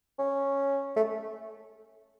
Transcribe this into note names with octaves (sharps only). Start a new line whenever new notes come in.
C#4
A3